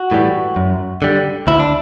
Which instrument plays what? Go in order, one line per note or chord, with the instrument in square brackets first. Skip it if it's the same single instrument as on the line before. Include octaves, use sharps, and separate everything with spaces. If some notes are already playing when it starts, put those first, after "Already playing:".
Already playing: [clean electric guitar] F#4
A2 E3 G3
F#2
D3 G3
D2 E4
D4